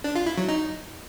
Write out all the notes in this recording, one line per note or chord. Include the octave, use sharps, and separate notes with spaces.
D4
F4
E4
F#3
D#4